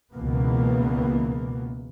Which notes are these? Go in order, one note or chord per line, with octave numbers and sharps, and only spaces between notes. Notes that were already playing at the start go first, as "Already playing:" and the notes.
C#2 B2 E3 A#3 B3